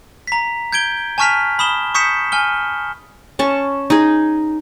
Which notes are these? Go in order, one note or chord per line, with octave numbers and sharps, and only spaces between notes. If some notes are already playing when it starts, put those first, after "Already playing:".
A#5 B6
G6 G#6 D7 G7
G#5 A5 C#6 F6 B6 F7
B5 D#6 E7 G7
C#6 D#6 G6 B6 C#7 E7
G#5 F6 G7
C#4 A5 C#6
D#4 G#4